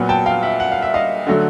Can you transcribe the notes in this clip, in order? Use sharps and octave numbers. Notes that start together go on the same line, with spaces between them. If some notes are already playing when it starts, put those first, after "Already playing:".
Already playing: A#2 F#3 B3
G5 A5
F5 G5
E5 F#5
F#5
F5
E5
D#5 F5
D3 F#3 A3